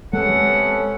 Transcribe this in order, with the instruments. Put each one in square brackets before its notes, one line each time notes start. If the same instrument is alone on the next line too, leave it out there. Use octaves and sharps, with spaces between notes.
[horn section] C3 B3 A4 [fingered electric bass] G#3 [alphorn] C#4 [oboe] F#5